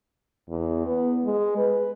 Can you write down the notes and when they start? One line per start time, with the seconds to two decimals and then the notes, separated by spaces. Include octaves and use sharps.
0.49 E2
0.86 B3
1.25 G#3
1.58 B4